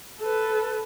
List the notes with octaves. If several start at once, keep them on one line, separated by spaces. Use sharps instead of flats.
A4 B4